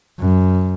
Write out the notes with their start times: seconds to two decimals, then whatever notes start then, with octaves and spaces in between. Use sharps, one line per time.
0.20 F#2